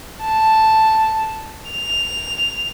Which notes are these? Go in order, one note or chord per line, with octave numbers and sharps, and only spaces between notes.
A5
F7